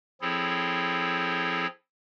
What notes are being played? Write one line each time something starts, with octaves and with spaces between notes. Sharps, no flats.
F3 C4 E4 G#4 A4 C#5